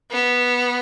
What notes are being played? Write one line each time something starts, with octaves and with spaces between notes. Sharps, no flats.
B3